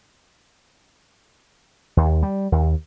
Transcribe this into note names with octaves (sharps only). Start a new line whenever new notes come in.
D#2
G3
D#2